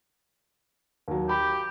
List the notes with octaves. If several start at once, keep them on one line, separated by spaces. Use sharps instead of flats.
D#2 F#3
G4 B5